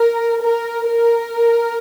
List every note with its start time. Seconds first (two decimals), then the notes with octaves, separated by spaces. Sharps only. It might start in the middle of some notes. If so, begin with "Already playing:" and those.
Already playing: A#4
0.41 A#4
0.88 A#4